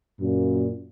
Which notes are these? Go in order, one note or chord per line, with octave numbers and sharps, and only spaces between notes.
F#2 A#2